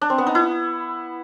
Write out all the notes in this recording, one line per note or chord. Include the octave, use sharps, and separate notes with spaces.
D4
C4
B3
D#4
E4